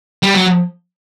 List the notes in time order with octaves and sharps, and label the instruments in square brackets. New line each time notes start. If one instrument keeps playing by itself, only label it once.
[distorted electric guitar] G3
F#3